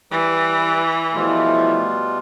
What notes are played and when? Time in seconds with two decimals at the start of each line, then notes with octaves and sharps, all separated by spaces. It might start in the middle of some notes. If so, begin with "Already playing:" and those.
0.11 E3 G3 B4 D6
1.14 B2 F3 G3 A3 E4 F4